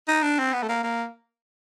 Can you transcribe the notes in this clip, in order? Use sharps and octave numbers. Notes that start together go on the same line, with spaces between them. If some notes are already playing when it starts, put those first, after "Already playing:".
D#4
D4
C4
B3
A3
A#3
A#3